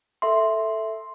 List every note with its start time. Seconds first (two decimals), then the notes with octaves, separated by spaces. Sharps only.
0.22 A4 E5 C6